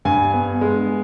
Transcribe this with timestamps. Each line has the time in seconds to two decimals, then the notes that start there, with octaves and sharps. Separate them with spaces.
0.05 G2 G#5
0.33 B3
0.61 G#3